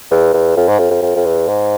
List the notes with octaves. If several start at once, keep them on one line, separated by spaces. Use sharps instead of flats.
E2
E2
F2
G#2
F2
F2
F2
F2
E2
G#2